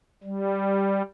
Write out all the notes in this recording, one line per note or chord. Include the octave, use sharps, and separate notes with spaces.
G3